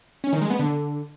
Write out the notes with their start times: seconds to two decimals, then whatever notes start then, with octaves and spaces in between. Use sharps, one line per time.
0.24 C#4
0.33 D#3
0.41 G#3
0.50 B3
0.59 D3